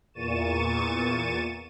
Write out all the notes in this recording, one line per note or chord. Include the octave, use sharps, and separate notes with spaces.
E2 A#2 C#6 A6 D#7 E7